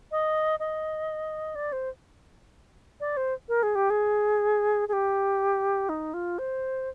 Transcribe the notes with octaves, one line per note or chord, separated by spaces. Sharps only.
D#5
D#5
D5
C5
D5
C5
A#4
G#4
G4
G#4
G#4
G4
D#4
F4
C5